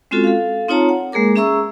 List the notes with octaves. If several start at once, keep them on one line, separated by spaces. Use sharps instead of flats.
G#3 C4 C#4 F4 F#4 A4
A4 F5
C4 D#4 F4 C#5 A5 A#5
F#5
G#3 A#3 G#4 A#4 D6
C#4 G#4 E5 A#5 C#6 E6